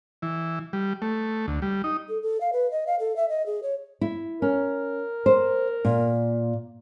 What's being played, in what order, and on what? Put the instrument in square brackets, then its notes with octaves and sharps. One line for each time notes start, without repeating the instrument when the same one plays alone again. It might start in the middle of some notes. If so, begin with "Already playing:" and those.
[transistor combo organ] E3
G3
A3
D2
G3
D#4
[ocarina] A4
A4
F5
B4
D#5
F5
A4
E5
D#5
G#4
C#5
[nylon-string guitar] E4
[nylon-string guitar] C#4 [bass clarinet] A#4
[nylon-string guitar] C5
A#2